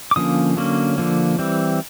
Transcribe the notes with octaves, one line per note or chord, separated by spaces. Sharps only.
D6
D3 F3 A#3 C#4 D#6
D3 F#3 A#3 C#4
D3 F3 A#3
E3 G3 C4